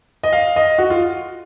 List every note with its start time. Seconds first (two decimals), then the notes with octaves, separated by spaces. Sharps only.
0.23 D#5
0.33 F5
0.56 D#5
0.78 F#4
0.90 F4